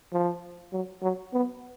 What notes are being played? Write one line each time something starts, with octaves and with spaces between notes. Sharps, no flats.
F3
F#3
F#3
B3